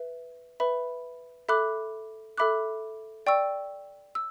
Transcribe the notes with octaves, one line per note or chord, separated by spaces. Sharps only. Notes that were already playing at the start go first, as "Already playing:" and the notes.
Already playing: B4 E5
B4 E5 B5
A4 E5 B5 D6 F#6
A4 E5 B5 D6 F#6
D5 G5 C#6 E6
E6